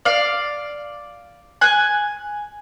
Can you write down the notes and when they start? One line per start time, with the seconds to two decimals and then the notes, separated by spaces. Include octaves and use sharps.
0.05 D5 F5
1.61 G#5 F#6